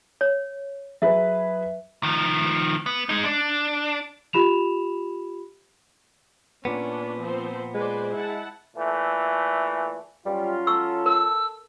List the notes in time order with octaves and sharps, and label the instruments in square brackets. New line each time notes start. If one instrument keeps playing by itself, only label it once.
[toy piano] C#5
[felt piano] F#3 G#4 B4 [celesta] E5
[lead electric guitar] D#3 F3
B3
G#3 D#4
D4
[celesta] F4 G4 B5 E7 F7
[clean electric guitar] A#2 B3 [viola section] C#4 D4
[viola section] F3 C4 C5
[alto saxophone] G#3 [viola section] B4 C5 D5
[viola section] E4 F#5 A5
[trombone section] A#2 E3 A3
[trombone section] F#3 C#4 F4 [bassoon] G3
[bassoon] A4 [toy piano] C#6 E6
[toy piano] A#4 [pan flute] E6